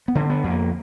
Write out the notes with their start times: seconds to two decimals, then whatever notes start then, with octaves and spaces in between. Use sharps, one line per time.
0.08 B3
0.15 D3
0.30 B3
0.44 F2
0.50 A#3